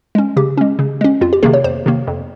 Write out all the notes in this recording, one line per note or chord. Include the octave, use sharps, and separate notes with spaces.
G#3 C#4
C#3 G4
G#3 C#4
C#3
G#3 C#4
F2 F4
G4
C3 D#3 A#3 G#4
C#5
F2 C5
C3 D#3 A#3
F2